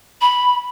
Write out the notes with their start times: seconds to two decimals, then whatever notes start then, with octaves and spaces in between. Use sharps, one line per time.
0.21 B5